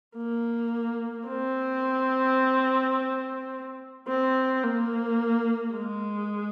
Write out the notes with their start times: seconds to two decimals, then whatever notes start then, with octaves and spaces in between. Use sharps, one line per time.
0.16 A#3
1.28 C4
4.08 C4
4.64 A#3
5.75 G#3